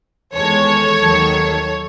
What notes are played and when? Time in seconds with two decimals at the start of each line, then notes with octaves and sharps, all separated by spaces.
0.34 E2 D#3 G#3 A4 C#5
0.99 D#2 D#3 F#3